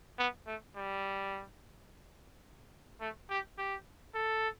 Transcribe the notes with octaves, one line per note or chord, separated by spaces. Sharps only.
B3
A3
G3
A3
G4
G4
A4